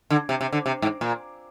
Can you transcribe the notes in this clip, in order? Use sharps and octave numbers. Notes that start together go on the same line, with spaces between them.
D3
C3
C3
D3
C3
G#2
A#2